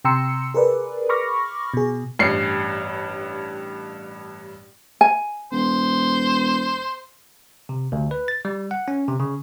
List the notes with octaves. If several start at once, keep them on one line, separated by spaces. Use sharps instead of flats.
C3 G5 A#5 C6 E6 C#7
G#4 A#4 B4 D5
B5 C#6 D6 F6 A#6
B2 G#4
A1 G2 C7 C#7
G#5
E1 C5
C3
D2
B4
A6
G3
F#5
C#4
C3
C#3